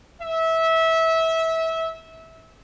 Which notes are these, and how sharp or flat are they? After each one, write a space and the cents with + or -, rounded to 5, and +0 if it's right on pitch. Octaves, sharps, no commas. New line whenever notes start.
E5 -20